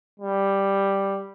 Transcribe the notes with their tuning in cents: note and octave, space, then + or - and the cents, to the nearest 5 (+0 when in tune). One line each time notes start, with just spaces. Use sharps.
G3 +5